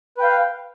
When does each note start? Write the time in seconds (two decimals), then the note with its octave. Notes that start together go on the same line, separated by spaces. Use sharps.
0.18 B4
0.20 G5
0.23 F5